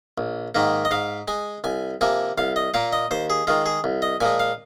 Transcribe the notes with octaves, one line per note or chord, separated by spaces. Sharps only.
A#1
G#2 D#3 A#3
D#5
G#2 F5
G#3 G#5
C2 G#5
C3 F3 A#3 G#5
C2 F5
D#5
A#2 A#3 F5
D#5
D#2 C5
G#4
D#3 G#3 F4
G#4
C2
D#5
A#2 F3 G#3 G#5
F5